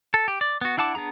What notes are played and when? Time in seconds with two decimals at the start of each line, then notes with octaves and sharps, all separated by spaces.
0.14 A4
0.28 G4
0.41 D5
0.61 B3 F#4
0.77 D4 E4 F#5 A5 D6
0.95 B3 D4 G#4 A#5